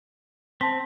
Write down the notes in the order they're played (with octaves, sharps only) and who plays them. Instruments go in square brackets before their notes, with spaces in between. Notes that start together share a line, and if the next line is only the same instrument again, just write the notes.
[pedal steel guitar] C4 [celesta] A5 C6 B6